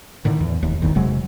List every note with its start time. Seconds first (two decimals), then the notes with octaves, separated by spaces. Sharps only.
0.25 A2 D3 D#3
0.41 E2
0.63 E1 D#2
0.82 G#1 E2 D#3
0.95 E1 C3 F#3 G#3